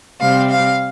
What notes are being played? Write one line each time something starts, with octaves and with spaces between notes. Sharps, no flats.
C3 G3 C4 F5
F5